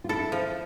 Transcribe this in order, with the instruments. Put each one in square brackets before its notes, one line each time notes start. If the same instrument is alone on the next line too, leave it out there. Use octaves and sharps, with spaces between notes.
[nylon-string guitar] F4
[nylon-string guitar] E4 [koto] A4
[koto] F3